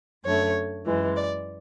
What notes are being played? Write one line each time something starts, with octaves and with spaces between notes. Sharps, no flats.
F#2 D3 A3 C#5
F#2 E3 G#3
D5